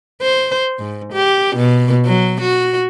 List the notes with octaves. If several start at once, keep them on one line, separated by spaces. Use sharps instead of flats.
C5
G#2
G4
B2
F#3
F#4